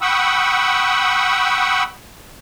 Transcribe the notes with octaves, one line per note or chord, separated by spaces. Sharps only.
F#5 G5 B5 C#6 D#6 E6